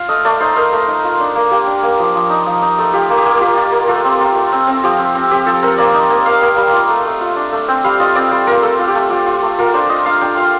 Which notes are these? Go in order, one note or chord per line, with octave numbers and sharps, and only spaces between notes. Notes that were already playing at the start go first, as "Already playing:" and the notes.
Already playing: F4 F5
A3 D#5
A3 D5
D#4 C5
D#4 A#4
A3
D#4
F4
D4
A#3
A#3 G4
D4
A#3
F3
F3
D#4
F3
D#4
A3
F4 G4
A#3
G4
A#3
F4 G4
F4
A#3
A3 F4
C4
F4
A3
C4
C4
F3 G4
C4
C4
C4 G4
F3 A4
C4 A#4
A#3 D5
D#4
A#3
A#3 F5
A#3
G3
F4
A3
A3
F4
D4
A3
C4 G5
G3 F5
F4 D#5
C4 D5
G3 C5
F4 A#4
A3 A4
F4
G4
A3
F4 G4
F4
A3
F4 A#4
D4 C5
F4 D#5
D4 F5
D4 G5
F4 F5